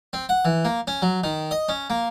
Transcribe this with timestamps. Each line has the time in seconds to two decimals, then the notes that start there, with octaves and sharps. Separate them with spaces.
0.13 C4
0.29 F#5
0.45 E3
0.65 A#3
0.87 C#4
1.02 F#3
1.24 D#3
1.51 D#5
1.69 C#4
1.90 A#3